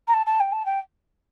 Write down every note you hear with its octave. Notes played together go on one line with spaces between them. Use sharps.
A#5
A5
A5
G5
A5
G5